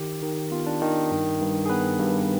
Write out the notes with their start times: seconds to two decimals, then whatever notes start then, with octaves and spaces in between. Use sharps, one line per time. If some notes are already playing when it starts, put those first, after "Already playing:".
Already playing: D#3 G4
0.22 D#3
0.51 B3 F4
0.66 D4
0.81 D#3 D#4
1.11 G2
1.40 G2
1.66 G#4
1.70 B3 B4
1.99 G2